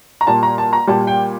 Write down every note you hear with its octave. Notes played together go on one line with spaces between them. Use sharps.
A#5
A#2 G3 A5
A#5
A5
A#5
A#2 G3 A5
G5